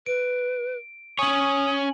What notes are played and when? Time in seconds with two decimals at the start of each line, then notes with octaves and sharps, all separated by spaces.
0.06 B4 D7
1.19 C#4 C#5 G#5 D#6 F#7